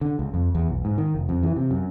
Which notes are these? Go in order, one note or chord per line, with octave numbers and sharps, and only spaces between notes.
D3
C#2
F2
E2
B1
G#2
D#3
F1
F2
E3
C3
F#2